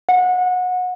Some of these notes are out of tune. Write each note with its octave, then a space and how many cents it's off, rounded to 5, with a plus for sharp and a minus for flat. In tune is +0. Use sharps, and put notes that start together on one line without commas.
F#5 -25